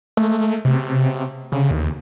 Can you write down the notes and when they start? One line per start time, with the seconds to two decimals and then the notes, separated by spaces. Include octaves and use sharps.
0.17 A3
0.65 C3
1.52 C#3
1.71 D#2